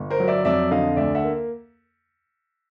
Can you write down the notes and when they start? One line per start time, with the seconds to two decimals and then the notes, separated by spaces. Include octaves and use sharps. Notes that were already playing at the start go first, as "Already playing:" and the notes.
Already playing: G1
0.10 A#4 C5
0.20 F#3
0.27 D5 E5
0.45 F2 D5 E5
0.71 D3 D#5 F5
0.96 D2 D5 E5
1.15 E5 F#5
1.23 A#3